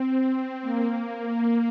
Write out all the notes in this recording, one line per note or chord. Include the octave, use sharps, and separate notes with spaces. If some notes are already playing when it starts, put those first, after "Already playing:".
Already playing: C4
A#3
A#3